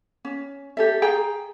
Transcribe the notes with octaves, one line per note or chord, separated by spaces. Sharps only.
C#4
G4 A4 E5
G#4 G5 A#5